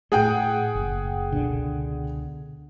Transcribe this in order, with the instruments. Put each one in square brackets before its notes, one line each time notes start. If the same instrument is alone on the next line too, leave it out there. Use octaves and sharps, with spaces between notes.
[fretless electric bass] A2 A3 [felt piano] G#4 F#5 G5
[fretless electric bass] F#1
C#2 B2 D3